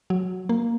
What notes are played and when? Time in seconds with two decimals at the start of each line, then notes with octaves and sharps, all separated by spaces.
0.10 F#3
0.49 A#3